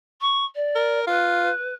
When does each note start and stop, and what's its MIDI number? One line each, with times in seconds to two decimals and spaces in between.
0.20 0.44 85
0.55 0.99 74
0.76 1.05 70
1.07 1.50 65
1.07 1.74 71